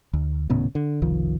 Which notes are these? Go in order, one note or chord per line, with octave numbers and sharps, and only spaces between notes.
D2
D#1 A2 C#3 B3
D3
F#1 C2 D#3 F3